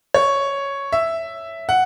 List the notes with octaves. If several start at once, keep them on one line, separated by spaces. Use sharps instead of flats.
C#5
E5
F#5